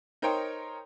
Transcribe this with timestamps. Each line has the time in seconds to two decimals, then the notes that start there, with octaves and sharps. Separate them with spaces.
0.22 D#4 A#4 C5 C#5 G5 C6